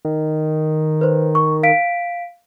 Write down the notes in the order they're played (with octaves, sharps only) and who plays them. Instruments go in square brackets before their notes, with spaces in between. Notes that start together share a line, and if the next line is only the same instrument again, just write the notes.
[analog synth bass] D#3
[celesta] B4 C5
C#6
F5 B6 D7